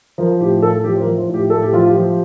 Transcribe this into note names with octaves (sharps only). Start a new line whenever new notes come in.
F3 A#4
A2 G4
A2 A4
F3 G4
C5
A#4
F3
C5
A2
G4
A2 A4
G4
F3 F4
G4
F3